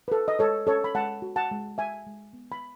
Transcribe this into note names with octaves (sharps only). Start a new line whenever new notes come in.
B4
F#4 A4
D#5
G#3 A4 C#5
C#4 A4 C#5
B5
G#3 F#5 A5
F#4
F#5 A5
G#3
F#4 E5 G#5
G#3
B3
B5